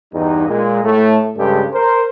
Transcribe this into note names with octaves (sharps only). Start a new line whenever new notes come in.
E2 G2 G3 D#4
A#2 G#3
A2 A3
G2 C#3 G#3 D4 G4 A4
A#4 C5